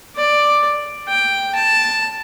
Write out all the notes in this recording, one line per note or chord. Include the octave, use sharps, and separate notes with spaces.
D5
G5
A5